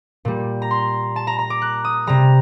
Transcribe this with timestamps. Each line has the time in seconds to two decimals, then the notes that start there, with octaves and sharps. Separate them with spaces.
0.25 A#2 G3
0.62 A#5
0.71 C6
1.16 A5
1.27 A#5
1.39 A#5
1.50 D6
1.62 F#6
1.84 D#6
2.07 C3 G3 A#5